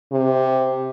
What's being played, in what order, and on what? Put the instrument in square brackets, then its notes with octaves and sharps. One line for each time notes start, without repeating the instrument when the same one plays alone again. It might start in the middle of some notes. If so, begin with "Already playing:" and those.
[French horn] C3